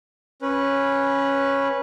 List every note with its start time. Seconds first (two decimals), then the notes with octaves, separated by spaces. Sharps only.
0.42 C#4 B4